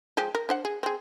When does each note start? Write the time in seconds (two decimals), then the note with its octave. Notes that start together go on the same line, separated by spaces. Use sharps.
0.17 F3 G#3 G4
0.35 A#4
0.49 D4 C5 F#5
0.65 G#4
0.83 C4 G#4